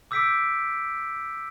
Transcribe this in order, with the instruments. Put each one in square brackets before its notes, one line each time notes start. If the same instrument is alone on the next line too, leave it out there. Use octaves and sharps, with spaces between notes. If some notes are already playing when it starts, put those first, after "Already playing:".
[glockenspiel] D6 E6 G6 B6 C#7 D7